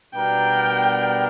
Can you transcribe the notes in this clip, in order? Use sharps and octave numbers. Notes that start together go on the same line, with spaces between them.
B2 G3 B3 D4 A#4 G5